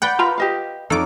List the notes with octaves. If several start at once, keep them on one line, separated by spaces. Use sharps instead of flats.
B4 D5 F#5 G5
F4 A#4 A#5 B5
G4 D#5 F5
F2 D#4 A4 C#5 D6